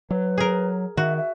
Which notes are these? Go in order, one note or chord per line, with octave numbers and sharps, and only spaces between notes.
F#3 B4
G#4 A#4
D#3 F#4 E5
E5